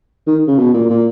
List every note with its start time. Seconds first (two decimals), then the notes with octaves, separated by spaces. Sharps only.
0.27 D#3
0.48 C#3
0.59 B2
0.74 A#2
0.90 A#2